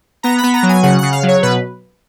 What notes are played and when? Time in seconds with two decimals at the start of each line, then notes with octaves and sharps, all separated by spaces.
0.23 B3 A#5
0.38 B5
0.43 B3
0.53 A#5
0.63 F#3
0.69 G#5
0.83 C#3 F#5
0.99 C#3 F#5
1.12 F5
1.23 F#3
1.28 C#5
1.42 B2 B4